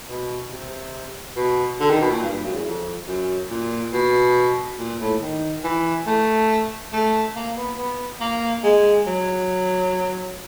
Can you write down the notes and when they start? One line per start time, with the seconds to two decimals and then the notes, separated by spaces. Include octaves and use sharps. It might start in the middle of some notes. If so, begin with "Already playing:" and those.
0.09 B2
0.51 C3
1.36 B2
1.80 D3
1.90 D#3
2.01 B2
2.11 A#2
2.23 G2
2.33 G2
2.44 F#2
2.54 E2
2.65 F2
3.08 F#2
3.50 A#2
3.93 B2
4.79 A#2
5.00 A2
5.21 D#3
5.64 E3
6.07 A3
6.93 A3
7.35 A#3
7.57 B3
7.78 B3
8.21 A#3
8.64 G#3
9.07 F#3